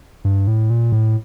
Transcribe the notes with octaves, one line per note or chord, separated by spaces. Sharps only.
G2
A2
A#2
A2